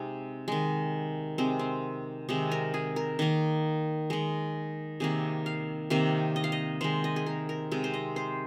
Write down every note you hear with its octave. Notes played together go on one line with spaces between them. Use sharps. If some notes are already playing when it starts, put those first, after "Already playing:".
Already playing: C3 G#3 D#4
D#3 G#3
C3 G#3 C4
C4
C3 D#3 G#3 D#4
A#4
G#4
A#4
D#3 A#3
D#3 G#3
C3 D#3 A#3 G#4
F5
C3 D#3 A#3 F5
D#5
F5
D#5
D#3 G#3 C5
D#5
G#4
A#4
A#4
C3 G#3
C5
D#5
C5